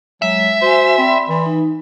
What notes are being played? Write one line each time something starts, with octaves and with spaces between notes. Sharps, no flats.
F#3 G#3 E5
F#4 C5 G#5
C4 D5 B5 C6
E3
D#4